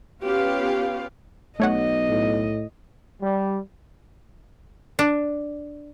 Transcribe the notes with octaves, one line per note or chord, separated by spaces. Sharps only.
B3 C#4 F4 G4 B4 F5
B1 A3 C#5 D#5 F#5
A2
G3
D4